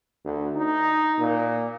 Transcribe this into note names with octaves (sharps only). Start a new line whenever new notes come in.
D2
D#4
A#2